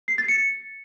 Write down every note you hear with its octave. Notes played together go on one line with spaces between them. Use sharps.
C7
A6
C#7